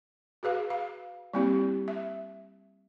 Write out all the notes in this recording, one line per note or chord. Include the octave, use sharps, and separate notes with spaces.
F#4 G#4 B4 F5
F5
G3 A#3 C4 E4 G4
E5